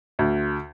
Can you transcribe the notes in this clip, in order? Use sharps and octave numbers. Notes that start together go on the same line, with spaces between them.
D2